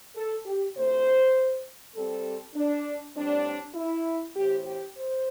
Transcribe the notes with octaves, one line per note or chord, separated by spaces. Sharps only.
A4
G4
D2 C3 A3 C5
C3 G3 C4 A4
D4
A2 G3 C4 D4
E4
A2 E3 C4 G4
G4
C5